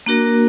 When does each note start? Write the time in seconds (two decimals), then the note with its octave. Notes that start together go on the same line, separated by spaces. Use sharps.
0.06 A#3 D4 F#4 A#4